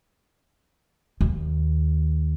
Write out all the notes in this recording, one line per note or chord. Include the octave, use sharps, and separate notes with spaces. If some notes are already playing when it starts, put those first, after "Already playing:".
D#2